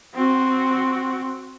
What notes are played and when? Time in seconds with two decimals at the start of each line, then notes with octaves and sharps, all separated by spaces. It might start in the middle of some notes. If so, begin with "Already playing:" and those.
0.14 C4 F#4